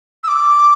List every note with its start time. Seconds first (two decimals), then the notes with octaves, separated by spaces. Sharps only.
0.24 E6
0.28 D6